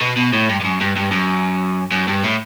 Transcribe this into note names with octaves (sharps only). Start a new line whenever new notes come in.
B2
B2
A2
G2
G2
F#2
G2
G2
F#2
F#2
G2
A2